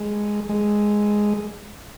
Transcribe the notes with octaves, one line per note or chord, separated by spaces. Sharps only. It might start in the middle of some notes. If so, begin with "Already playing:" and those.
Already playing: G#3
G#3